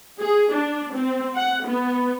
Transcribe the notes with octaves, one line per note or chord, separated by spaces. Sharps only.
G#4
D4
C4
F#5
B3